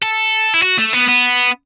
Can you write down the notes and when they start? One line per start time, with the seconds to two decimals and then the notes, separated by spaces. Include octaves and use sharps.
0.03 A4
0.54 E4
0.63 F#4
0.78 A3
0.93 B3
1.09 B3